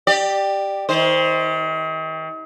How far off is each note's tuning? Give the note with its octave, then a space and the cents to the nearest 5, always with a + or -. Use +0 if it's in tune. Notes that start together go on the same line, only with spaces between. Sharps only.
G4 +0 D5 +20
D#3 +40 C5 +0